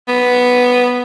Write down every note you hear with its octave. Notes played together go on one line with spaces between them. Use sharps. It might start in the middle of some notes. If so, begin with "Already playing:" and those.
B3